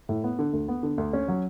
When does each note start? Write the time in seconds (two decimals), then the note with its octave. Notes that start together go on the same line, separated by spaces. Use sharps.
0.09 A2
0.24 B3
0.39 D3
0.53 D2
0.68 B3
0.83 D3
0.98 D2
1.13 C#4
1.28 F#3